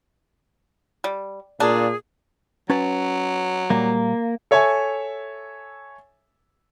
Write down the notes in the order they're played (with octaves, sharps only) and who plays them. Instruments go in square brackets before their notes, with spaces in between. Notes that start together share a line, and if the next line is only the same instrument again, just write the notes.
[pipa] G3
[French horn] A#2 [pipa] A#3 D4 [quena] G#4
[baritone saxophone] F#3 [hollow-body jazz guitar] C#4 B4 A5
[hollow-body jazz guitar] A#2 G3 [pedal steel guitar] A#3
[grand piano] A4 C#5 E5 G#5